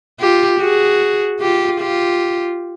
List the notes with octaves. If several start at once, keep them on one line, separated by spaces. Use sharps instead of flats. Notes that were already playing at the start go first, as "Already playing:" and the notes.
F4 G4
F#4 G#4
F4 G4
F4 G4